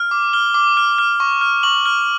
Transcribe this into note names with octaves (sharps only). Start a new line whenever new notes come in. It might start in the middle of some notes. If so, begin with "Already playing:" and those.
Already playing: F6
D6
F6 G7
D6
F6 G7
F6
C#6
F6
C#6 F#7
F6